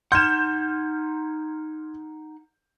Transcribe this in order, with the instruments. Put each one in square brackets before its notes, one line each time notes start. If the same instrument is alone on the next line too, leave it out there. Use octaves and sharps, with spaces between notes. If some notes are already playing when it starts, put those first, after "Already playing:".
[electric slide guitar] D#4 F#5 [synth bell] C6 F6 G#6 [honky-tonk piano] G6 E7